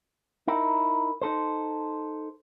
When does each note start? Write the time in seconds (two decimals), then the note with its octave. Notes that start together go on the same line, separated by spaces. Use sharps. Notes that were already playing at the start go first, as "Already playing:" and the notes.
0.47 D#4 E4 A#4
1.21 D#4 A4 C5